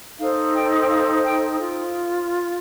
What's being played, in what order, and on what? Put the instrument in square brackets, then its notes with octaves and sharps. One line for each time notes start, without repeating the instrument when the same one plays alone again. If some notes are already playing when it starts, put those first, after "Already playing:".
[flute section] D#4 A4 C5 F5
G5
G5
F5
G5
F4